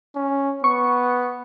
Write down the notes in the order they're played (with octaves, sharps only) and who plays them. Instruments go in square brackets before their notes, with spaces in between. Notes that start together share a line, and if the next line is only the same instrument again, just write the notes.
[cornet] C#4
[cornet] B3 [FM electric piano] C#6